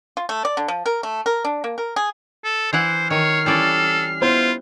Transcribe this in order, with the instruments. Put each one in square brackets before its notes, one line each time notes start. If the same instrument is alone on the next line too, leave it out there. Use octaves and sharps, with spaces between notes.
[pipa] F4
A3
D5
D3
F3
A#4
A3
A#4
D4
A#3
A#4
G#4
[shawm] A4
[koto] E3 E4 F#5 [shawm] C5
[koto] D#3 [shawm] C#5 [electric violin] F6 C7
[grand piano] E3 [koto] G3 C#4 D5 [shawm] A4
[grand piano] B3 E4 C5 [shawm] F4